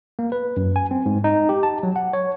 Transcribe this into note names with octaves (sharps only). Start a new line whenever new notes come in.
A#3
B4
F#2
G#5
C4
G#2
D#4
G4
A5
F#3
F#5
C#5